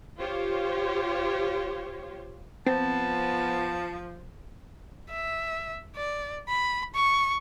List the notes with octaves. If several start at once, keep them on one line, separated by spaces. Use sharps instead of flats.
F4 G4 C5 C#5
F3 B3 C4 A5
E5
D5
B5
C#6